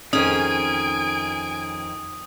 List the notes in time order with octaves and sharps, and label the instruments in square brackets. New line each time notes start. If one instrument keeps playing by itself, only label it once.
[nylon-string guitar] F2 D#3 D#4 [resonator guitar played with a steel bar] C#4 G#4 [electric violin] G#5 D7 [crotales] D#6